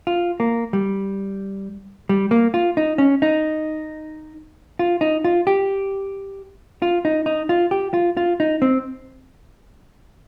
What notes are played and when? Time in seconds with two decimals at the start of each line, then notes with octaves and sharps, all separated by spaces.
0.07 F4
0.40 A#3
0.73 G3
2.09 G3
2.31 A#3
2.54 F4
2.77 D#4
2.98 C#4
3.22 D#4
4.79 F4
5.01 D#4
5.24 F4
5.47 G4
6.82 F4
7.05 D#4
7.26 D#4
7.49 F4
7.71 G4
7.94 F4
8.17 F4
8.40 D#4
8.62 C4